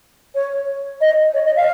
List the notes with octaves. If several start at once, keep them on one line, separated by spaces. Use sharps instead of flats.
C#5
D#5
C#5
D#5
F5